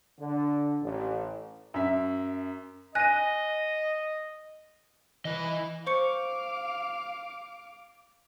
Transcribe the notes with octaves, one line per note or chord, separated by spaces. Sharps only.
D3
A1
F#2 E5
D#5 G#5 F#6 A#6 D#7
E3 B4 D#5
C5 F5 C#6 D6 C#7